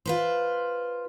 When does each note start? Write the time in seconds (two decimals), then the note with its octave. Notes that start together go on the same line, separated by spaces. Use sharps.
0.06 F4 B4 C5